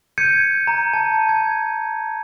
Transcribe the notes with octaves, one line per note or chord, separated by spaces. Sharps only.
G6 G#6 C#7 D#7
A#5
A5
G#6